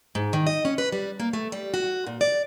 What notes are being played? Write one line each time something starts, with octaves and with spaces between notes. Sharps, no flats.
G#2
D#3
D#5
C#4
B4
G3
A#3
A3
G3
F#4
A#2
D5